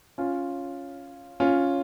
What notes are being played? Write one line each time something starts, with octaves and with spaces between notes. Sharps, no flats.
C#4 F4
C#4 F4